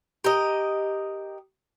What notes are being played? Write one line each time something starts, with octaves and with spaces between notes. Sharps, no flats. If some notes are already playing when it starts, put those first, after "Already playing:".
G4 A#4 D#5